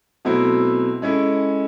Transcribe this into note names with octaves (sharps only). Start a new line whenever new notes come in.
B2 F#3 A3 C4 E4
G#3 C#4 E4 A4